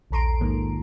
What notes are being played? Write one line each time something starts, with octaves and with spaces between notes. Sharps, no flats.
A#1 D#2 A4 A#5 C6 D7
G#2 D#3 F3 G#3 A#3